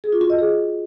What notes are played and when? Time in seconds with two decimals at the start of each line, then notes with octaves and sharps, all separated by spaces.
0.04 G#4
0.12 F4
0.21 F#4
0.30 D#5
0.39 G#4